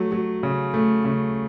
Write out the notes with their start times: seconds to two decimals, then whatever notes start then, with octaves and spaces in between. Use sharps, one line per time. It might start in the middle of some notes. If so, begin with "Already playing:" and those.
Already playing: F#3 A3
0.12 F#3
0.43 C#3
0.74 A3
1.05 C#3